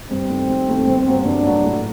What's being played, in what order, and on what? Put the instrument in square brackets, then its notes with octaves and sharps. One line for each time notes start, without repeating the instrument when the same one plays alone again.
[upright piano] G2 [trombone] C4
[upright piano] D#3 A3
G2
D#3 A3
G1
G2 F#3 A#3
[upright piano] G1 [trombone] D4
[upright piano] G2 F#3 A#3
A2